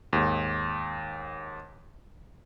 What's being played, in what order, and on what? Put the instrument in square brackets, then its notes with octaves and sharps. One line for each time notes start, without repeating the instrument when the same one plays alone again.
[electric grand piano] D#2 G#2